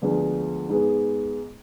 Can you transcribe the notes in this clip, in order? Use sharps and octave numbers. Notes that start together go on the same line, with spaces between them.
D2 D3 F3 G#3 B3
G#2 G#3 B3